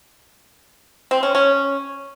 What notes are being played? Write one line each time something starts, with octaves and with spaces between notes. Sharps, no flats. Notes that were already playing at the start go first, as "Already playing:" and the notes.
C4
C#4
C#4